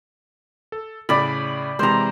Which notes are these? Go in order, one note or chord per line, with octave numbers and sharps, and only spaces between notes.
A4
A2 C#3 D5 B5
C3 E3 G#3 C5 A#5